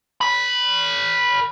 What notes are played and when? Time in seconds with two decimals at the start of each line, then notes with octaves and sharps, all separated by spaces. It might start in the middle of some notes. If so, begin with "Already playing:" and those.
0.21 A#4 B5